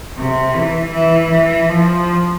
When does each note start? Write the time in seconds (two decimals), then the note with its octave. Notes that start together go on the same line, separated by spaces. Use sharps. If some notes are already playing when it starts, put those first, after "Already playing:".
0.17 C3
0.55 E3
0.93 E3
1.32 E3
1.70 F3